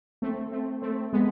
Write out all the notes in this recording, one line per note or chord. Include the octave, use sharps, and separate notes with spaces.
A3 C4
A3 C4
A3 C4
G#3 B3